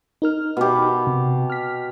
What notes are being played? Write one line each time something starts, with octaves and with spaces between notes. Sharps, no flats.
D#4 A#4 F6
B2 G4
C3
F6 B6